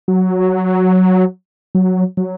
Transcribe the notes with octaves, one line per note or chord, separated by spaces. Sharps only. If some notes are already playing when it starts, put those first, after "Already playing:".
F#3
F#3
F#3